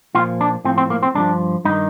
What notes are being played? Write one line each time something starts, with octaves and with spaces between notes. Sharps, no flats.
A#2 F3 F4
D4
A2 F3 C4
C4
A#3
C4
G2 D3 F3 D4
G2 D#3 D#4